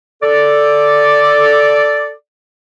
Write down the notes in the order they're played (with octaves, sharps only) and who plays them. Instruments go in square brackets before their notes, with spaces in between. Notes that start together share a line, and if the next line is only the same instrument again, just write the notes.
[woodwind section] A4 D5